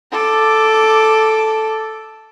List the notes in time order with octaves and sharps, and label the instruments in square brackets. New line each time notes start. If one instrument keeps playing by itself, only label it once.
[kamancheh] A4 D6